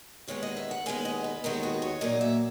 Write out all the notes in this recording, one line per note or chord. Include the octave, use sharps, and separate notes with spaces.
D#2 D#3 G#3 B3 C#5
D#5
E5
F#5
D#2 D#3 G#3 B3 G#5
D#5
B4
D#2 D#3 G#3 B3 A#4
F#4
C#5
A#2 F#3 A#3 D#5
E5